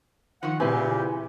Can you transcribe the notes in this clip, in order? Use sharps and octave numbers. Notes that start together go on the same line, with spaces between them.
D#3 F3 F#5
A#2 C#3 E3 C4 G4 B4 G#5